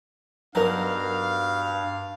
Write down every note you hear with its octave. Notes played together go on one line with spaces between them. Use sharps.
G2 F#3 G3 B3 D#4 A#4 F5